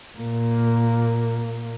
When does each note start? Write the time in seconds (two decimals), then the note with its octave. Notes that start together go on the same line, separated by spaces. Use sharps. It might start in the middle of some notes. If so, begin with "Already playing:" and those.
0.17 A#2 A#3